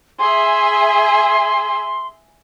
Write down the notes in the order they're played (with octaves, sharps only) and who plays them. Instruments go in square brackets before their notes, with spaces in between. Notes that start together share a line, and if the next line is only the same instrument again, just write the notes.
[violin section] G#4 E5 [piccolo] C6